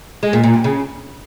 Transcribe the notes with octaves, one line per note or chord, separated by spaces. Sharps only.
G#3
A#2
A#2
G2
C#3